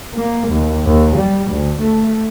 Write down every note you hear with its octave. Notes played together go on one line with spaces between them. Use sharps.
A#3
D#2
D#2
G3
D2
A3